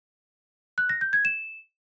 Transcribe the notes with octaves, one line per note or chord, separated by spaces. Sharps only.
F#6
A#6
G6
G#6
E7